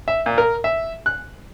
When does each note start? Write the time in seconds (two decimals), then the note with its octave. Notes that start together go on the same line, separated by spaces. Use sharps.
0.08 E5
0.26 A#2
0.38 A#4
0.64 E5
1.06 F#6